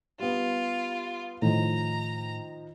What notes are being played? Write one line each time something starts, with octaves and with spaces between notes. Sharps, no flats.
G3 B3 F4
A2 D#3 F3 A#5